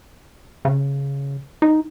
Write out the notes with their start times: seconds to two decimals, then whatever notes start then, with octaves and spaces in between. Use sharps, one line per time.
0.65 C#3
1.62 D#4